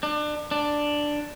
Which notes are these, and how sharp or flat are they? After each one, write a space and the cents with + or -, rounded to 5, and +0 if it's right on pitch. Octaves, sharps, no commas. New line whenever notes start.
D4 +30
D4 +5